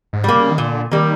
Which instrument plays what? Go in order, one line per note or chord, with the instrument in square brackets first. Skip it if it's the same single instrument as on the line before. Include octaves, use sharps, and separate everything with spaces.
[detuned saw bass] G#2
[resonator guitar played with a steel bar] G3 A#3
[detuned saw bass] C#3
D#3
[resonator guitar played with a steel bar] A#2 [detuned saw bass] D3
[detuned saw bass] D#3 [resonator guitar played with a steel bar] G3 A#3